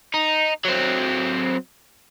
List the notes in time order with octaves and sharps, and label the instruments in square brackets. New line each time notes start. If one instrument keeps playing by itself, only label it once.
[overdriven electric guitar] D#4
F#3 C4